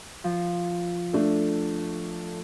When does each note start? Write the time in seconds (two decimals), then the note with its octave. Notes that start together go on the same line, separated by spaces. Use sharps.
0.24 F3
1.13 A3 D4 A4